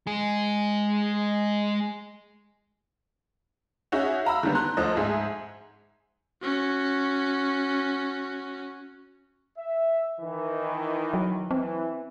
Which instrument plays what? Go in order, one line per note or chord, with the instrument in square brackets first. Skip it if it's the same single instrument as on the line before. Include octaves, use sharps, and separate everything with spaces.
[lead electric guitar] G#3 G#4
[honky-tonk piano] C#4 D#4 F#4 G#4 E5
F5 A#5 B5 E6
D3 D#3 G3 B3
A#5 C6 F#6
D2 F3 A4 C5 D#5
G#2 G#4 E5
[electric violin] C#4 F#4
[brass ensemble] E5
D#3 E3
[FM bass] F#3
[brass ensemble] E3 [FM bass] C4